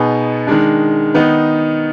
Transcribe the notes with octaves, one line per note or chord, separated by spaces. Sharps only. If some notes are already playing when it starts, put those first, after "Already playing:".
Already playing: B2 B3 D#4 G#4
D#3 G#3 D4
D#3 B3 D#4